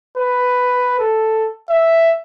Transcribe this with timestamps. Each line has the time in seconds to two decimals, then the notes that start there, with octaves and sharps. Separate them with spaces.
0.18 B4
1.00 A4
1.70 E5